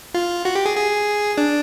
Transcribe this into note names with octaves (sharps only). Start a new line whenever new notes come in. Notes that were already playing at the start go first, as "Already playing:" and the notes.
F4
F#4
G4
G#4
G#4
D4